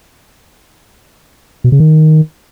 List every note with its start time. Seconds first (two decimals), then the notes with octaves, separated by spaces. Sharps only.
1.64 B2
1.72 C#3
1.80 D#3